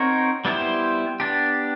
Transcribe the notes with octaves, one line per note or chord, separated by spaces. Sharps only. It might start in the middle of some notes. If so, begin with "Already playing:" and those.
Already playing: C4 D#4 F#4 A#4 C#5
G3 B3 E4 G4 C5
B3 D4 G4